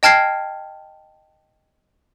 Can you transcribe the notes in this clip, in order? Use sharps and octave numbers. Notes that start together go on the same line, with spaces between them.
D#5 G5 A5 F6 G#6 C7